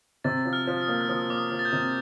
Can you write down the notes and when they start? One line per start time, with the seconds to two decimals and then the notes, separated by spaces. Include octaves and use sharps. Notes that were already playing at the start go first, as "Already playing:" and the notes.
0.24 C3 A6
0.46 F3
0.53 F6
0.67 F3
0.81 D#6
0.88 A#3
1.01 F6
1.09 F3 D#6
1.30 A#3 D6
1.38 D#6
1.52 F3
1.59 A6
1.65 G6
1.73 C3